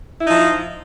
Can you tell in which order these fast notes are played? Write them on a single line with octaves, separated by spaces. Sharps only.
E4 D#4 F3